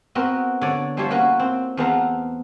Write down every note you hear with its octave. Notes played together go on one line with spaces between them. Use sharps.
B3 C4 F#4 A#4
D3 C#5 D5
F3 G3 E4 G4 C5 C#5
A#3 C#4 F#4 B4
C4
E2 A3 B3 C4 F5 A#5